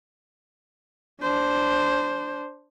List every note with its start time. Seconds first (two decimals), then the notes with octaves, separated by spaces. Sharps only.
1.21 D4 C5